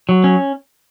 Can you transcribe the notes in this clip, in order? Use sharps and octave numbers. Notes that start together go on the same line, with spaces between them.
F#3
C#4